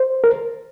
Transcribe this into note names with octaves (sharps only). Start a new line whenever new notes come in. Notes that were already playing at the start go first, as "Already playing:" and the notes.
Already playing: C5
A#4